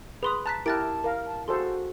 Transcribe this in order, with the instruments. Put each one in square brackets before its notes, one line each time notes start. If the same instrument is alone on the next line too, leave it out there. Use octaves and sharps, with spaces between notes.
[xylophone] G#4 C6 D#6 [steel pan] B4
[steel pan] A5 [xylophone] A#5 F#6 B6
[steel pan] E4 G4 A#4 [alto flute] A5 [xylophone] F#6 A6 D7
[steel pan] A#4 F5
[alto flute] A5
[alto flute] F#4 [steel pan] G#4 A4 C5 [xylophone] C6